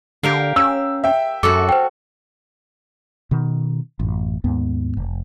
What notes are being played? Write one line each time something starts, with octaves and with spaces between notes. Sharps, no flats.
D3 G4 A#4 F5
C#4 E6
E5 G5
F#2 F#4 A4 D6
C5 G5
B2 D#3
A1 F#2
D#2 G#2 B3
F1